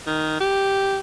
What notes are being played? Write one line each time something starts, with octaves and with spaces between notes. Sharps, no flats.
D#3
G4